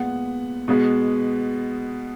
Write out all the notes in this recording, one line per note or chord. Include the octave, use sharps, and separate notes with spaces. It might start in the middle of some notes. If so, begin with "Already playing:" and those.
Already playing: A#2 G#3 B3 F#5
B2 G#3 B3